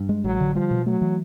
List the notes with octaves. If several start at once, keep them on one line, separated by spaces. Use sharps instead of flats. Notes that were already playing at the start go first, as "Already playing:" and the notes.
Already playing: G2
G#3
A1 F#3
D3
F3 G3
B2
F#3 A3
E3